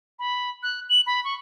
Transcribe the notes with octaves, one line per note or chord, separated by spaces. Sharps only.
B5
F#6
F#7
B5
C#6